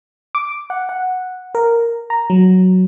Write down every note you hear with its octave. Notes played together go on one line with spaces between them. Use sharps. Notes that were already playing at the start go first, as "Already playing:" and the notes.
D6
F#5
F#5
A#4
A#5
F#3